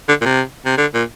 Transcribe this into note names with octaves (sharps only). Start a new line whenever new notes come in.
D3
A#2
C3
C3
D3
A#2